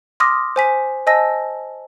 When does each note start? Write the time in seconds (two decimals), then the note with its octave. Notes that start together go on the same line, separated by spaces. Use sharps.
0.20 C6 D6 D#6 F6 A#6
0.56 C5 G#5 B6
1.07 C5 D#5 G#5 A5 E6 A#6